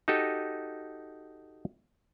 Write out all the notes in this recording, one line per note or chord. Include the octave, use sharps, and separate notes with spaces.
D#4 F#4 G4 A4 D#5